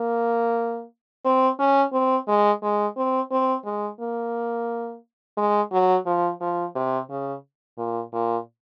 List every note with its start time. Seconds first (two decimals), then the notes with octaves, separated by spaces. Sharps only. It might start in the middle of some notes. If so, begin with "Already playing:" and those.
Already playing: A#3
1.25 C4
1.59 C#4
1.93 C4
2.28 G#3
2.63 G#3
2.97 C4
3.31 C4
3.65 G#3
4.00 A#3
5.37 G#3
5.72 F#3
6.06 F3
6.41 F3
6.75 C3
7.10 C#3
7.78 A#2
8.13 A#2